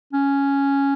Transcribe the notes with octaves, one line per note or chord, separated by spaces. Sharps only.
C#4